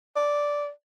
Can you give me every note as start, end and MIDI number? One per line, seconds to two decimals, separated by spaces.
0.16 0.69 74